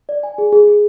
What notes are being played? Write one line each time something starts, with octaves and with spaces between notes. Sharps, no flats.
D5
G#5
G#4
G#4
G#4